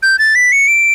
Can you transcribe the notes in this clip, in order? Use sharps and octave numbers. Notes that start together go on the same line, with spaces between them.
G6
A6
B6
C#7
D7